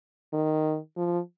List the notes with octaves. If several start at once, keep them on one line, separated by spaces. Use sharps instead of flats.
D#3
F3